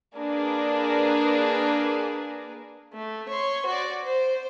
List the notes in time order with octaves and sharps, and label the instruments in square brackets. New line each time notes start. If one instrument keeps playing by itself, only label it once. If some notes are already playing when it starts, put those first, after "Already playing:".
[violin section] A#3 D4 G#4 A#4 B4
[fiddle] A3
C#5 C6
F#4 D5
C5